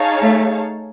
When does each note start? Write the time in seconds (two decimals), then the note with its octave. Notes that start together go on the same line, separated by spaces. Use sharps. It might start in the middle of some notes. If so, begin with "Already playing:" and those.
Already playing: D#4 G#4 C#5 F5 A5
0.21 A3